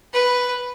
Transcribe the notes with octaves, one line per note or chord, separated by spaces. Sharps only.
B4